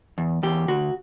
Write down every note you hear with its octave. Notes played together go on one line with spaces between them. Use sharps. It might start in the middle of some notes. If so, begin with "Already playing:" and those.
E2
E2 G4
D2 F#4